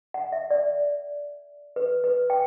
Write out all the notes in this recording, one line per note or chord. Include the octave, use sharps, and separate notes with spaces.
F#5
E5
D5
B4
B4
G5